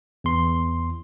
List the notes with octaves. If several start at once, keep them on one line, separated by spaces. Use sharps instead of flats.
E2 C6